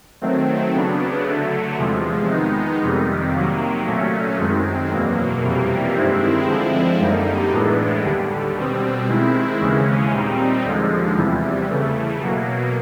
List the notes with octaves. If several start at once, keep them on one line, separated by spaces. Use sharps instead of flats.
D#3 F#3 A3 C4
C#3 F#3 B3 D4
D3 F#3 A3
E2 C3 F3 G#3
D#3 G#3 B3 D#4
F2 C3 D#3 G3
C3 D#3 F#3 A#3
A#2 F#3 A3 C#4
F#2 D#3 G#3 C4
E2 B2 F#3 A#3
F2 C3 E3 G3 A#3
G2 D#3 G#3 C4 E4
D3 F3 G#3 C4 E4
F#2 D3 G3 A#3 D#4
A2 E3 G#3 B3 D4
D#2 D3 G3
B2 G3 C4
D#3 G#3 C4 E4
D#2 C#3 E3 G#3 C#4
A#2 G3 C4 D#4
D#2 D3 F3 G#3
E2 C3 E3 G3
C#3 E3 A3
B2 F#3 A#3